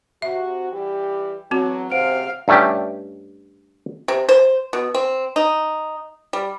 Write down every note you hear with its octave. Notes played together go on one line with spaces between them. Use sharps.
C3 F#4 E5
E3 G3 G4
E2 E3 F#3 C4 F#4
G#2 C3 C5 F5 F#5 D7
G2 A3 C#4 G4
C3
C5
B2
C4
D#4
G3